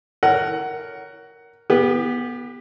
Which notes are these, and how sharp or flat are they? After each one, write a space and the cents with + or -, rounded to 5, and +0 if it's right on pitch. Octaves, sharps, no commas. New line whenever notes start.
A#4 +0 C#5 +20 F#5 +15
B3 -10 G4 +25